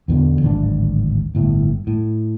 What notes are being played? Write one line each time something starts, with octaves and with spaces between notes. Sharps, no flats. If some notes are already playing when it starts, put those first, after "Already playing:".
E2 B2 D3
D1 G#1 C4 D4
G1 A2
A2